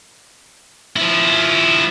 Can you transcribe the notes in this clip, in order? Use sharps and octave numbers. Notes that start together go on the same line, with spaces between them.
F3 E4